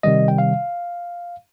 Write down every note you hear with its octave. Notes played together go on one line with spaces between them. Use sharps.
C3 D#3 G3 D#5
G5
F5